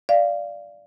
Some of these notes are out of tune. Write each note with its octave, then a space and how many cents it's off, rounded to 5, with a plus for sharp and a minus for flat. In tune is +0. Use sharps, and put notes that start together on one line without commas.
D5 +0 F5 -15